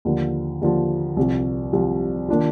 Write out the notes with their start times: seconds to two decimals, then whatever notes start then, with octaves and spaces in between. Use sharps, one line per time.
0.05 D#2 D3 F3
0.61 D#2 D3 F3
1.17 C2 C3 F3
1.73 C2 C3 F3
2.29 D#3 A#3 D4 F4